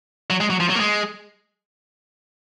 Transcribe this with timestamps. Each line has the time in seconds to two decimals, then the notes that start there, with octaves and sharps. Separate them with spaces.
0.30 F#3
0.40 G#3
0.50 F#3
0.60 F3
0.70 F#3
0.75 A#3
0.80 G#3